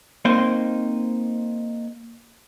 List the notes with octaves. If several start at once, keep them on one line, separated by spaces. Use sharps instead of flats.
A#3 C4 D#4 C5